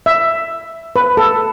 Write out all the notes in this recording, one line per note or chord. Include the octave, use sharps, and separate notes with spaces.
E5
B4
A4